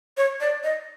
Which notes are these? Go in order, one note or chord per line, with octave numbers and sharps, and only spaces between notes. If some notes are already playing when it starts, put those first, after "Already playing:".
C#5
D5
D#5